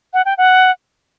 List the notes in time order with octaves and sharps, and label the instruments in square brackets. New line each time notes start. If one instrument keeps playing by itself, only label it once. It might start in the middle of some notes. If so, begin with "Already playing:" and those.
[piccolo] F#5
G5
F#5